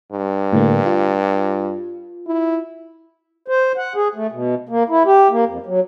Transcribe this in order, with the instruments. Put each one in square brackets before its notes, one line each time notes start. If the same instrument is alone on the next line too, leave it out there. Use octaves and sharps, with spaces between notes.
[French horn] G2
[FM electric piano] A2 D3 A#3
F4
[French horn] E4
[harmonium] C5
F#5
G#4
A3
B2
A#3
E4
G4
A#3
F2
F#3